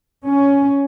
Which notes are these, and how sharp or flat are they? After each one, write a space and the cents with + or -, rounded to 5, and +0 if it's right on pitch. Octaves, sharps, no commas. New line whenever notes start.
C#4 +10